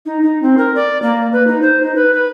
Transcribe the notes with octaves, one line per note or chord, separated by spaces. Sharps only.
D#4
D#4
C4
A#4
D5
A#3
B4
D#4
C5
D#4
B4
B4